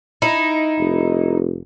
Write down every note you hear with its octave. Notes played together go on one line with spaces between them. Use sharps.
D#4 E4
F1